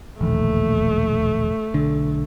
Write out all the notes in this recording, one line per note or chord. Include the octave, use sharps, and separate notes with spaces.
E1 A#1 D#2 A3
B1 D3